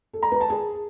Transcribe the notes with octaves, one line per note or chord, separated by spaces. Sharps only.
A4
A#5
B4
A5
G#4